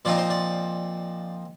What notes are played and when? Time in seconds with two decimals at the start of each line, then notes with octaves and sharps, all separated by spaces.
0.05 A#2 F3 C4 D#4 D5
0.18 C5
0.30 D5